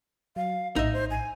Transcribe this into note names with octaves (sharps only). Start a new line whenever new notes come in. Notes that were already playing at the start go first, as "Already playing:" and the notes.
F#3 F5
A#1 A2 D#4 D#5 E5
C5
G#5